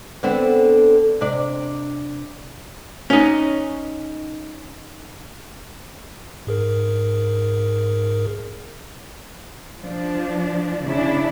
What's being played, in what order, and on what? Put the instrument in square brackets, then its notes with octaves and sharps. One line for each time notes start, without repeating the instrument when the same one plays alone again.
[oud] D3 B3 C4
C3 D4 D5
[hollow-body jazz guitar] C#4 D#4
[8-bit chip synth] G#2 G#4 A#4
[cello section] F3 D4
C#3 D4 E4